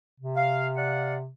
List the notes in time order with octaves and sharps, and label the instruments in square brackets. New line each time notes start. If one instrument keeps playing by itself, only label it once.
[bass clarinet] C3
[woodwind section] F5
D5 F5 F#5